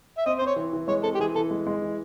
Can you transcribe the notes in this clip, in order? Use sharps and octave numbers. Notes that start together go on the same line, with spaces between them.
E5
C4 D#5
C5
C4 C#5
E3
E3
G#3 C#5
C4 A4
G4
E3 G#4
E3 A4
G#3
G#3
E3